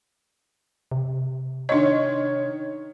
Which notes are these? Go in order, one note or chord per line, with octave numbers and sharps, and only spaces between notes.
C3
D#3 D4 C#5 D#5